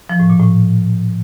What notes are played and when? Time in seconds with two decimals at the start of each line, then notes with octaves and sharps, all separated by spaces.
0.10 F3
0.20 A2
0.30 A#2
0.40 A2